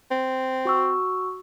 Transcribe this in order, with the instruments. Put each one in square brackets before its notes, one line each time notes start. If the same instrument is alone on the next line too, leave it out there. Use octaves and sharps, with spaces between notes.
[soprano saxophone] C4
[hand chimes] F#4 C#6 E6